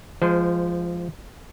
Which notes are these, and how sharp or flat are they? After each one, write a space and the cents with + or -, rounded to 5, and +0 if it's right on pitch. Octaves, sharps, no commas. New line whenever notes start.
F3 -10 G#3 +0 C5 -30